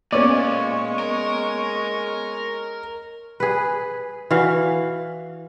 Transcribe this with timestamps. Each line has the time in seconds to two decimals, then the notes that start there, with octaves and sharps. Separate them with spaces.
0.12 A#2 G#3 A#3 B3 C#4 C#5 D5
0.99 A#4
3.40 G#4 B4
4.31 E3 F#4 F5